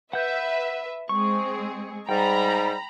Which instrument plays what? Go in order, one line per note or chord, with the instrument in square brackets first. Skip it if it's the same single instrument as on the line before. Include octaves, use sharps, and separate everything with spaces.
[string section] B4 E5 [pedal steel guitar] F#5 G6
[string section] G#3 C4 G#4 [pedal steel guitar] C#6
[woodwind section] G#2 G3 [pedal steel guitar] G5 [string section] A#5 B5